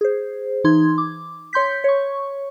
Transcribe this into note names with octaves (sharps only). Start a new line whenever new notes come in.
G#4 C5
E3 D#4 C6 G#6
D6
C#5 C6 G6 B6
C#5 C#6